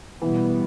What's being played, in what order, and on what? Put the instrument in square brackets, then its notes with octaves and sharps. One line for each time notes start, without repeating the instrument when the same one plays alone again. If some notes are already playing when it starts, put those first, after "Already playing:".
[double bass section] B2 G3 B3 [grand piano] E3